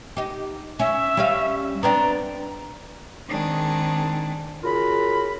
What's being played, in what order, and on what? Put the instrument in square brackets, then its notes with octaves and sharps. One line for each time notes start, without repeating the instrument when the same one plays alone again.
[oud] D#4 G4
[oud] C#4 [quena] E5
[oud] G3 C#4 F5
[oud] B3 C4 D4 [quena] A#5
[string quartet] D#3 G#3 C4 D4 G#4
[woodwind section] C#3 F4 F#4 A#4 B5